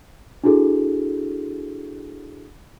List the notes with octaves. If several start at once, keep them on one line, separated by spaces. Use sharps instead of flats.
D4 E4 F#4 G#4 A4